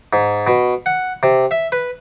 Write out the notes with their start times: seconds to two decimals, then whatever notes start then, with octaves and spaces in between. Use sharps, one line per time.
0.13 G#2
0.47 B2
0.86 F#5
1.23 C3
1.51 E5
1.72 B4